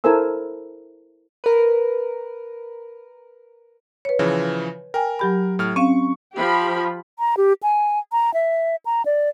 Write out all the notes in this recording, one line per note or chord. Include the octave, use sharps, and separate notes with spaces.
E4 A4 A#4 C5 G#5 E6
A#4 B4
B4 C#5
C#3 E3 F3
A#4 G5 G#5
F#3 G4 B5
A2 F6
C4 C#4 F5 C#6
F3 G4 B5
A#5
G4
G#5
A#5
E5
A#5
D5